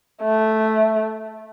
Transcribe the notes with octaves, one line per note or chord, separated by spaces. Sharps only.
A3